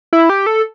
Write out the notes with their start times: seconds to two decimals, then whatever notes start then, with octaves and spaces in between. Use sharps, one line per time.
0.13 E4
0.29 G4
0.46 A4